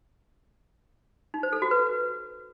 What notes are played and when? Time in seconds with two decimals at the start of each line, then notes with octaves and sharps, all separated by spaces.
1.34 D#4
1.43 C5
1.53 A4
1.62 F#4
1.71 B4